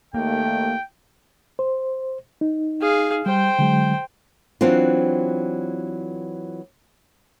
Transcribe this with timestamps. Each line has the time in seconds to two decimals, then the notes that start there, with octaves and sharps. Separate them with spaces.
0.14 D#2 A3 A#3 G5
1.59 C5
2.41 D#4
2.81 G#4 F5
3.26 G3 C5 G5
3.59 D3 F#3 G#3
4.61 E3 F#3 C4 D4 F4